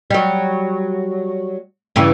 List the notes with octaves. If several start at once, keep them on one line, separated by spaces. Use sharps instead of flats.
F#3 G3
G2 C#3 E3